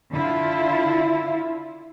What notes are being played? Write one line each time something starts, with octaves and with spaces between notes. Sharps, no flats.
D3 E4 F4